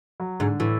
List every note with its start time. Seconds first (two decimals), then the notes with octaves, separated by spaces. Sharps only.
0.20 F#3
0.40 G#2 D3
0.60 A2 E3